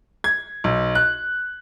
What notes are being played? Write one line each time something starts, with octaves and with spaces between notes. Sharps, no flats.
G#6
B1
F#6